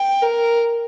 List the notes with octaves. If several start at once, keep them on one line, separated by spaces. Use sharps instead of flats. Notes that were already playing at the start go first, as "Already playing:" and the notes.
Already playing: G5
A#4